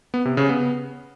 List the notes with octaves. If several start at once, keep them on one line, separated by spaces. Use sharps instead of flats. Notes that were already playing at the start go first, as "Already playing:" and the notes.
B3
C3
C#3
B3